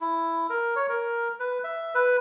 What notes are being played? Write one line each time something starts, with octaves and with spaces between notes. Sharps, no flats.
E4
A#4
C#5
A#4
B4
E5
B4